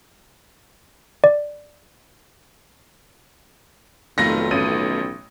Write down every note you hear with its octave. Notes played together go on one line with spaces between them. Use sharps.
D5
F1 B1 D#3 A3 F4 A#6
A1 D#7